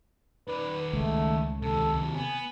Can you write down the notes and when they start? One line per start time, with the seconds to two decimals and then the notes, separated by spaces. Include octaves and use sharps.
0.48 D#3 B4 D5
0.93 C#2 A3
1.62 D#2 C3 A4
2.15 B3 G#5